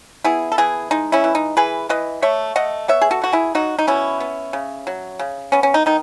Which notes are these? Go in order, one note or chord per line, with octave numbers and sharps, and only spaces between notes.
B3 E4 G#4
A4
E3 E4 G#4
G#3 D#4
C#4 E4
E3
D#4
E3 G#4 B4
E3 B4 D#5
A3 C#5 E5
A3 D#5 F#5
B3 C#5 E5
G#4
F#4 A4
B2 F#4
E4 G#4
F#3 D#4 F#4
D#4
B2 C#4 E4
B3
C#3
F#3
C#3
B3 C#4
C#4
D#4
D#3 D#4